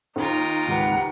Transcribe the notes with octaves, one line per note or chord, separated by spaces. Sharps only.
D#2 D#4 F4 A#4
G#1 C#2 G4 B4 F#5 A#5